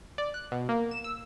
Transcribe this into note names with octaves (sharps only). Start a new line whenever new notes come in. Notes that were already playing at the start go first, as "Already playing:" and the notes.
D5
F#6
B2
A#3
E7
E6